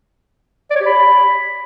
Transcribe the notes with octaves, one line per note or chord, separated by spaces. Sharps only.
D5
C#5
G4
B5